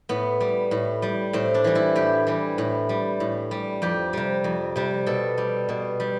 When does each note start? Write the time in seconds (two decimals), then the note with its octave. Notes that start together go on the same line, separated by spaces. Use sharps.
0.09 A2 B3
0.40 G3
0.71 A2
1.02 G3
1.33 A2 C4
1.54 D4
1.64 E3 G3
1.75 E4
1.95 A2 G4
2.27 E3 G3
2.58 A2
2.89 G3
3.20 A2
3.51 G3
3.82 F2 G4
4.13 C3 G3
4.44 F2
4.76 C3 G3
5.06 B2 A4
5.38 G3
5.69 B2
6.00 G3